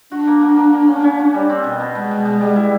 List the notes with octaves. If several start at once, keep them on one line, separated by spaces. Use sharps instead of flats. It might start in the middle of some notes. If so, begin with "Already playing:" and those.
D4 F#4
A#3
A#3
A#3
A#3
C#4
C#4
F#4
G3
C4
B2
B2
B2 G#3
B2
B2
G3
E4